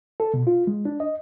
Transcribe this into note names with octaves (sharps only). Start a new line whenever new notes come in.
A4
B2
F4
G#3
D4
D#5